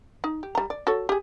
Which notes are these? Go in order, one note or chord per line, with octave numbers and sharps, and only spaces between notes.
D#4
G4
G3 A#5
D5
F#4 A4 C#5
G4 G#4